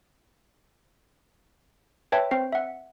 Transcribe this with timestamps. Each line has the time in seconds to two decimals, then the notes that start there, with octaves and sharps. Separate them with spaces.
2.12 B4 C#5 E5 G5 A5
2.31 C4 C5 C7
2.52 E5 F#5